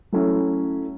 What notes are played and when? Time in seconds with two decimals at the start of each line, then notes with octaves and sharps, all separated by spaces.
0.13 F#3 A3 C#4 E4